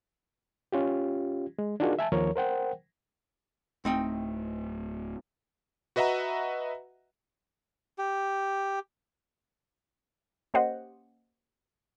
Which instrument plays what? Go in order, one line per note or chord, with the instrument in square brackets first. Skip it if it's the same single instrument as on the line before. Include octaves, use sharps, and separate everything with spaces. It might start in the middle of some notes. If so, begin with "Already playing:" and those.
[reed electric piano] C#4 F4 G4
G#3
D4 D#4 F4 F#4 G#4 A#4
E5 G#5 A5
D#2 F3 A#4 C#5
A#4 C5 F#5 G5
[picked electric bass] D1 A3 [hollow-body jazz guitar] C4 D#4 G5
[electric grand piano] F#4 B4 D#5 E5 F#5 A#5
[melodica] G4
[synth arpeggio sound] A#3 C#4 G4 C5 D#5 F#5